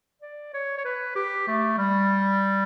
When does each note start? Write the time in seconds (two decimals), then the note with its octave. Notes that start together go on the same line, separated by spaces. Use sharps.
0.22 D5
0.54 C#5
0.78 C#5
0.85 B4
1.16 G4
1.47 A3
1.78 G3